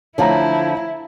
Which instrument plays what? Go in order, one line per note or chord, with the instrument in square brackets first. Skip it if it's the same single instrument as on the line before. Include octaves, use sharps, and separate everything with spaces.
[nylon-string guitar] D3 F3 A3 [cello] E4 [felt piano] C#5 F5 A#5